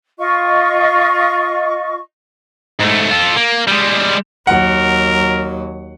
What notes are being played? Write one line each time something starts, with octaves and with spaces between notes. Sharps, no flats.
F4 D#5 C#6
G#2 A3
F4 A4
A#3
G3 G#3
D#2 F#3 A#4 F#5